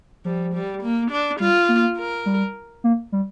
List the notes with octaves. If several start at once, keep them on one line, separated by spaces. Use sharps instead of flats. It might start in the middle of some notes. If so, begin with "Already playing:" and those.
F3 G3
G3
A#3
D4
G3 F4
A#3
A#4
G3
A#3
G3